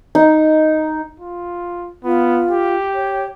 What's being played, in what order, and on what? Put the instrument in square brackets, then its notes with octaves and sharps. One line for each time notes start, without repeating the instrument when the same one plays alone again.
[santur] D#4
[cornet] F4
[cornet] B3 [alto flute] F4
[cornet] G4
[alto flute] C#5